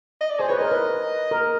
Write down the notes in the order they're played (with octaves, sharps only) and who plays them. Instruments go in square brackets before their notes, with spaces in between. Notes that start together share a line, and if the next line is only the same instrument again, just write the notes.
[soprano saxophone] D#5
D5
[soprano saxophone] G#4 [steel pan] C5
[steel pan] B4 [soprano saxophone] C#5
[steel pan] A#4 [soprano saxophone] D#5
[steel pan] B4
A#4